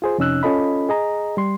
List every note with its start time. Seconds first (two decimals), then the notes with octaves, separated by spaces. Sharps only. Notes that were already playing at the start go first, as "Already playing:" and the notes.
0.02 F4 G#4 C5
0.18 F2 C3 C#4 D#4 E6 F#6
0.43 C#4 F4 A4 D#5 B5
0.89 G#4 D#5 A#5
1.37 G3 C6